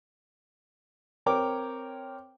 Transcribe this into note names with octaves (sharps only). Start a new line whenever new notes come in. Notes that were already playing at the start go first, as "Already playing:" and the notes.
C4 A#4 C#5 G5 D6